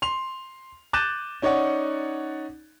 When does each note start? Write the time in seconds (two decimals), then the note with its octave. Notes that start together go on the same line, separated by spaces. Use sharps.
0.02 C6 F7
0.93 D6 F#6 G6 A6 D#7 E7
1.42 C#4 D#4 C#5 D5 F#5